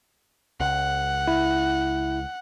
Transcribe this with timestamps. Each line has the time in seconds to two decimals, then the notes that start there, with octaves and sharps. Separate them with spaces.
0.60 C#2 F#5
1.28 E4